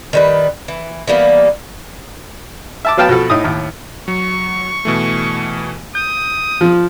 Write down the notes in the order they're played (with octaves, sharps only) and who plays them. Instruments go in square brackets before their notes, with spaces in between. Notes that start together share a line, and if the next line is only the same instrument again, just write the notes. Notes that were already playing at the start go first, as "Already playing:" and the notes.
[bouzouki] D#3 G3 B4
E3
E3 G3 A#3 B3
[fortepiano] E5 A5 D6
F#3 B3 F5 G5 A5
B2 F3 F#4 A4
A2 D#4 D#6
D#2 A2
[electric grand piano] F#3 [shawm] C#6
[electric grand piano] B2 E3 A3
[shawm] D#6 [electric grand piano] G6
[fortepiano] F3